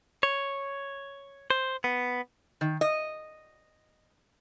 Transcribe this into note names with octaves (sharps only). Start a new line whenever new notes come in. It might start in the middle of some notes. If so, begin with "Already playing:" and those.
C#5
C5
B3
D#3
D#5